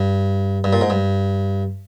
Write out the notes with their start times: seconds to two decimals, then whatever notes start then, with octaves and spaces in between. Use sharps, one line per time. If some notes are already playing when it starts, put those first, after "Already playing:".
Already playing: G2
0.64 G2
0.73 A#2
0.81 G#2
0.90 G2